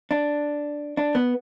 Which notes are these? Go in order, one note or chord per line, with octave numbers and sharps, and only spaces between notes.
D4
D4
B3